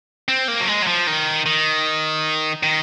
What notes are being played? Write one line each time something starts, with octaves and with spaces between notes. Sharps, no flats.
C4
A#3
F#3
G#3
F#3
F3
D#3
D#3
D#3